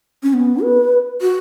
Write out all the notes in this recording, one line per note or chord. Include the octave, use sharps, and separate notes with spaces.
C#4
B3
B4
F#4